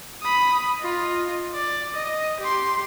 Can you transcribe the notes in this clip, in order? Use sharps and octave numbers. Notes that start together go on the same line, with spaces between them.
B5 D#6
F4 D#5
D5
D#5
G4 C6